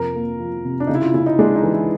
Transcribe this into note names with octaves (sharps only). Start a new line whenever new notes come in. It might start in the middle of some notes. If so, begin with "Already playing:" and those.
Already playing: F2 C3 F3 A#4
A#3
F3
C3
D4
C#3 D#4
E4
F4
C#3 E4
D#4
G#3 D4
D#4
E3
E4